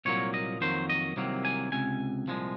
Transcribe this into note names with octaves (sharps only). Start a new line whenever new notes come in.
C2 A#2 F#3 A#3 C#5
D#5
F2 D#3 F#3 A#3 C5
D#5
C2 C3 D#3 F#3 A#3
G#5
C#2 C3 G#5
C2 A#2 F3 G#3